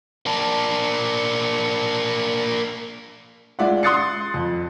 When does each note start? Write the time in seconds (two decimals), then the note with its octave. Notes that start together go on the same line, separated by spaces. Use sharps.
0.26 A#3 D4
3.59 G#3 F4 D5 E5 F#5
3.83 C6 D#6 F#6 A6 C7 C#7
4.34 F2